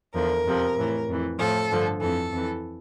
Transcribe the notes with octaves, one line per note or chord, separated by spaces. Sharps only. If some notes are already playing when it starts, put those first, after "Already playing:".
E2 D3 F3 A#4
F2 C3 F3
A2 E3
F2 E3
A2 F3 A4
G2 D3 F3
F2 E3 A4
F2 E3